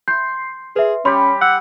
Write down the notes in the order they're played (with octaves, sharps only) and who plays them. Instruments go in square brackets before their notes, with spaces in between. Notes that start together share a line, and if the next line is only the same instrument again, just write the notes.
[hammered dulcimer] C6 [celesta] G6
[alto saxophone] G#4 [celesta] B4 E5
[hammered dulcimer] G3 G4 [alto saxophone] C#4 [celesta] C#5 B5 C6
[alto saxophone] F#5 [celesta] E6